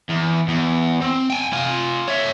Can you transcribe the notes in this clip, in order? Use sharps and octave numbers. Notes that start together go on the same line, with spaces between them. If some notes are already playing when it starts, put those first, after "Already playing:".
E2
E2
C4
G5 G#5
F4 G#5
C#5 E5